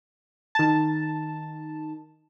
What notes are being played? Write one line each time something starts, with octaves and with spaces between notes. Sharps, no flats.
D#3 A5